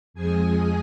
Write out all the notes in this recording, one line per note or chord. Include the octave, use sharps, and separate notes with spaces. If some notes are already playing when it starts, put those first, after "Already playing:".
F2 F3 G#3 G#4 G#5